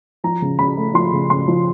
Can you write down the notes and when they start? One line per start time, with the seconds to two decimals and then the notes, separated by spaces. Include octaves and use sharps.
0.24 F3 A#5
0.42 C#3
0.59 C#3 B5
0.77 A3
0.94 F3 C6
1.13 C#3
1.30 C#3 C6
1.48 F3